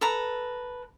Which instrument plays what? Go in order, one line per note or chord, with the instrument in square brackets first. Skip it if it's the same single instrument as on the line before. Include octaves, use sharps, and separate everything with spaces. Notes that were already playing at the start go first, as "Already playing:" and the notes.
[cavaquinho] A4 B4 A#5